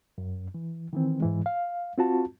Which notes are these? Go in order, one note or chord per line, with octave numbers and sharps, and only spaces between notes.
F#2
E3
D#3 E3 C4
G#2 E3 G#3
F5
C4 F4 F#4 A5